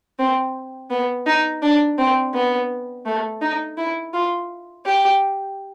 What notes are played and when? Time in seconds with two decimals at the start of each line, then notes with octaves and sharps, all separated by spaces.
0.19 C4
0.90 B3
1.26 D#4
1.62 D4
1.98 C4
2.34 B3
3.06 A3
3.41 D#4
3.77 E4
4.13 F4
4.85 G4